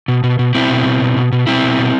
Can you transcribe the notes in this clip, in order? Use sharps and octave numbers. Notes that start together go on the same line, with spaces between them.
B2
B2
B2
B2 C4 E4
B2
B2
B2
B2
B2
B2 C4 E4
B2
B2